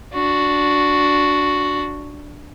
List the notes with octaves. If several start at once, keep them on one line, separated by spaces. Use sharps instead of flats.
D4 F#4